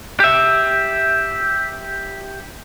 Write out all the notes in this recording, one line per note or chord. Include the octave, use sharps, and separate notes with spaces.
G4 E5